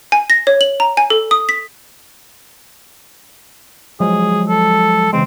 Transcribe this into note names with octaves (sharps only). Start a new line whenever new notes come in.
G#5
A#6
C#5
F#7
A#5
G#5
A4
D#6
B6
F3 F#3 G#3 G#4
A4
C#3 E3 G#3 C4